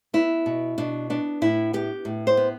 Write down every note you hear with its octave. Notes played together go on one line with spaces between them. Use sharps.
B3 E4
B2
B2 D4
B3 D4
A2 E4
B3 G4
A2
C5
B3